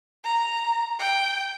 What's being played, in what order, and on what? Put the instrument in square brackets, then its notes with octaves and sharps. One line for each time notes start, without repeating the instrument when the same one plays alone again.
[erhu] A#5
G5